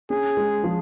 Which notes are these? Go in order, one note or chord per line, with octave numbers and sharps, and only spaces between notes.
C#4 G#4
G#3
F3